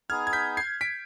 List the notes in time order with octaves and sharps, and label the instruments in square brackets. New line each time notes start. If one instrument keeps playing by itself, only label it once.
[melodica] B3 D#4 G#4 [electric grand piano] F6 G#6
[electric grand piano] G#6
G6 B6
G#6 C7
B6 D7